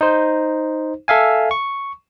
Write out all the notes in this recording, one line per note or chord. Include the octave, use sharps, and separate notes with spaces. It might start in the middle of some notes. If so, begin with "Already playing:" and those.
D#4 C5
A4 E5 F5 G#5
C#6